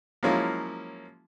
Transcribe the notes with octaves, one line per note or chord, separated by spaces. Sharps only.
F3 F#3 G#3 A#3 C#4 E4